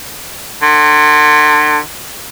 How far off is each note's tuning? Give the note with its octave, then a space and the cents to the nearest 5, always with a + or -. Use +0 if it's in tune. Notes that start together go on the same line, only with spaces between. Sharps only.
D3 +40